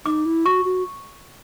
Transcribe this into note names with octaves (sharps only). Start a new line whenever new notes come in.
D#4 D6
E4
F#4 C#6
F#4